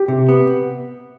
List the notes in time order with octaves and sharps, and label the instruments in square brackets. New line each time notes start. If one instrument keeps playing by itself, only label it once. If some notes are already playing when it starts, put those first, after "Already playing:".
Already playing: [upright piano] G4
[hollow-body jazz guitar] C3
B3